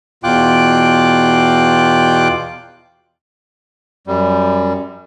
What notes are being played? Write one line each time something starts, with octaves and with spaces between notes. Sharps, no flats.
E2 B2 F4 G5 D6 F#6
F#2 G3